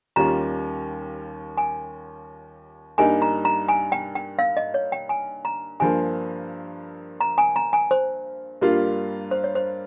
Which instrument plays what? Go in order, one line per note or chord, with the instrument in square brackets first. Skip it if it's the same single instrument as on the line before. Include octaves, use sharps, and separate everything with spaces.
[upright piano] D#2 D#3 G3 C#4 F4 [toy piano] A#5
[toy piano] G#5
[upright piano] G2 G3 A#3 D#4 [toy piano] G#5
[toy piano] A#5
A#5
G#5
G5
G5
F5
D#5
C#5
G5
G#5
A#5
[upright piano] G2 F3 A#3 [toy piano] G#5
[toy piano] A#5
G#5
A#5
G#5
C5
[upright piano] G2 G3 A#3 F4
[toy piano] C5
C#5
C5